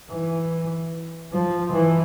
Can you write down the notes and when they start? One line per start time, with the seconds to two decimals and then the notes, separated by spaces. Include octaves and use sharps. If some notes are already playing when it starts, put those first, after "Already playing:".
0.11 E3
1.33 F3
1.72 E3